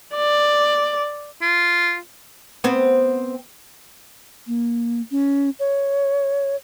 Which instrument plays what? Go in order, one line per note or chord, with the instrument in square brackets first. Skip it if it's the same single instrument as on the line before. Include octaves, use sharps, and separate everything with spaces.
[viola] D5
[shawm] F4
[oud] B3 C4
[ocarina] A#3
C#4
C#5